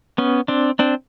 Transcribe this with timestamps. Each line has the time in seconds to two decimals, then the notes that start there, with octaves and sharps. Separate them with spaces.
0.18 B3 C#4
0.48 C4 D4
0.79 C4 D4